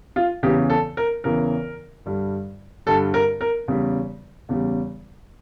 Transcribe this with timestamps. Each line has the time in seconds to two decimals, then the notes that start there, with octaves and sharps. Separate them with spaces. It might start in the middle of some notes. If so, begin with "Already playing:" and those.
0.16 F4
0.43 E2 C#3 E3 G4
0.70 A4
0.97 A#4
1.24 E2 C#3 E3 A#4
2.06 G2 D3 G3
2.86 G2 D3 G3 A4
3.14 A#4
3.41 A#4
3.68 E2 C#3 G3
4.49 E2 C#3 G3